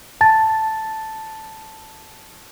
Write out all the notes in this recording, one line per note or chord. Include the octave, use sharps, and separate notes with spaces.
A5 A6